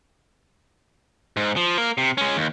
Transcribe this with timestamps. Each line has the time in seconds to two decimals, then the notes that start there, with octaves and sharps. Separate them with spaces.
1.37 G#2
1.56 F3
1.77 A#3 A#4
1.98 C3
2.17 G#3 C#4
2.37 D#2